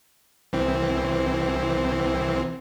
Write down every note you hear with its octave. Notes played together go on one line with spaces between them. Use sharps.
C2 E3 C4